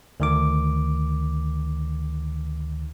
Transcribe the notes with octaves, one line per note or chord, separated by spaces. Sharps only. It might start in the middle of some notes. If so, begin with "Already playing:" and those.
D2 D#3 D6